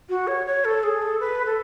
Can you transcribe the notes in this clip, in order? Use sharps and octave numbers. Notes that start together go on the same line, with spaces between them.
F#4
C#5
C#5
A4
G#4
A4
B4
A4